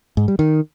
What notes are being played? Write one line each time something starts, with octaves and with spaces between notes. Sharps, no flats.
G#2
G3
D#3